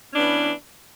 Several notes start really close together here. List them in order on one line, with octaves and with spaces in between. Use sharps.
C#4 D4 B3 E3